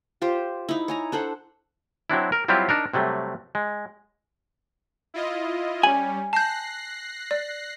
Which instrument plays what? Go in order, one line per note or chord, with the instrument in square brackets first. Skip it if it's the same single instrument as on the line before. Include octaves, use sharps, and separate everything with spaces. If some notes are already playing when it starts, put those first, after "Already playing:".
[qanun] F4 G4 C5
D#4 E4
C#5 G#5 A#5
D4 A4 C5 F#5
[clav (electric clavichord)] F#3 C4 D4 E4
A#4
F#3 G3 C4 E4 F4 G4
D4 D#4 A#4
C3 F#3 G3 A3
G#3
[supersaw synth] E4 F4 D#5
[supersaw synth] G3 C#4 [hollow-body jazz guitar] G#5 [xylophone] F#7
[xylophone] A5 G6 [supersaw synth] F#6 A#6 C7
[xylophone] D5